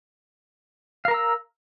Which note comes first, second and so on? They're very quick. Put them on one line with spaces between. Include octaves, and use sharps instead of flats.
F5 A#4 A#5 E6